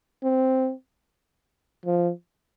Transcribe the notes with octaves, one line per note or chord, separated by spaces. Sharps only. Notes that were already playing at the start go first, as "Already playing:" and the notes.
C4
F3